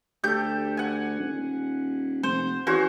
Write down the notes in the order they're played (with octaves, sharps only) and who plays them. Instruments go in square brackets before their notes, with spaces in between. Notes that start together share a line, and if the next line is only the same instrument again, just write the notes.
[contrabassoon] D2 [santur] G4 A4 [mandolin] G6
[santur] F#5 G#5
[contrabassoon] D#1
[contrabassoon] F1 [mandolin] C5
[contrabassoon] E3 [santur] C#4 F#4 C5 [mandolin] G#4